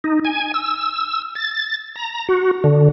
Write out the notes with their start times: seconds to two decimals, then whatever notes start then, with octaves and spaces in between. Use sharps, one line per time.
0.04 D#4
0.25 G#5
0.54 E6
1.35 A6
1.96 A#5
2.29 F#4
2.64 D3